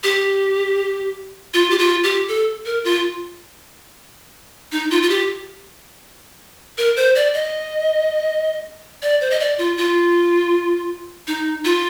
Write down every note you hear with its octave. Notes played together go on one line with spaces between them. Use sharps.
G4
F4
G4
F4
G4
A4
A#4
F4
D#4
F4
F4
G4
A#4
C5
D5
D#5
D5
C5
D#5
D5
F4
F4
D#4
F4